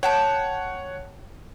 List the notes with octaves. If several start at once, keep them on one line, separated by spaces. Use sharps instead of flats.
C#5 F#5 G5 A5 G6